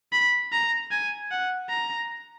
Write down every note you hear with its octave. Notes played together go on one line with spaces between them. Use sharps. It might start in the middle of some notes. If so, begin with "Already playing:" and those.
B5
A#5
G#5
F#5
A#5